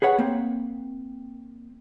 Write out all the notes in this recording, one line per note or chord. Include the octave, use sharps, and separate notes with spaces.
G#4 B4 C#5 F#5
A#3 C4